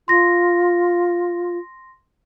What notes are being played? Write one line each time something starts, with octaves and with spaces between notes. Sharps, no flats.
F4 C6 A#6